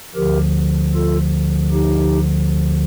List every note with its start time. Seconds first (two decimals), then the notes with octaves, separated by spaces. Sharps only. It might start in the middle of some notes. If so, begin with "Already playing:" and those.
0.14 D2 D3 F3 G4 A#4
0.94 F4 A4
1.71 D#4 G4